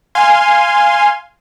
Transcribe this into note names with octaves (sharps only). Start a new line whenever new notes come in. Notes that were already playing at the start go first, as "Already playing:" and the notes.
F5 G#5 C6